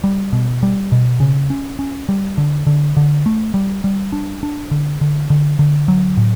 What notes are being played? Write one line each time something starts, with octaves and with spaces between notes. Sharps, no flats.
G3
B2
G3
B2
C#3
C#4
C#4
G3
D3
D3
D3
A3
G3
G3
D4
D4
D3
D3
D3
D3
F#3
A2